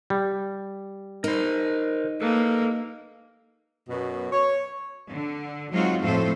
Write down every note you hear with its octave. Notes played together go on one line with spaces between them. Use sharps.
G3
D#4 A#4 C5
A#3 A4 B4
F#2 B2
C#5
D3
F#3 G#3 C4 D#4 F4 F#4
F2 A2 A3 F4 A4 C5